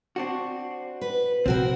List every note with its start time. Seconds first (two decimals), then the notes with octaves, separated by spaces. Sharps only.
0.16 C4 D4 F#4
1.01 B4
1.46 A#1 C3 F3 C4 F#4 A#4